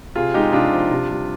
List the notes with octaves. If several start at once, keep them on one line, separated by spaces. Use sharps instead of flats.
C3 F4 G#4
G#3 D#4 G4
C3 D4 F4
F3
C3
G3